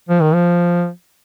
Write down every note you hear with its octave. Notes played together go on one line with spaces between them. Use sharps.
F3
D#3
F3